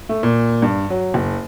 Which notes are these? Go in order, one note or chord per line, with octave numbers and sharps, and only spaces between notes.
A3
A#2
G2
F#3
F#1